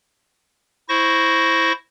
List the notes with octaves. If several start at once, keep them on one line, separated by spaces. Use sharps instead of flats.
E4 C5 C#6 A#6